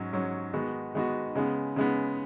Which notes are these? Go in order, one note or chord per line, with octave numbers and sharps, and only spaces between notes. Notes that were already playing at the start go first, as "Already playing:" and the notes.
Already playing: G#2 F#3 C#4
G#2 F#3 C#4
D#3 G#3 B3 D#4 F#4
D#3 G#3 B3 D#4 F#4
C#3 G#3 B3
C#3 G#3 B3